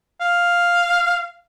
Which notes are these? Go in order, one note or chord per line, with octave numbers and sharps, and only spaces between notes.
F5